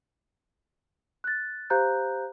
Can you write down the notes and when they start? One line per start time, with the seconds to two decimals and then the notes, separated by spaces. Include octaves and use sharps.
1.24 F#6 A6
1.70 G4 C5 F5 A#5 F#6 G6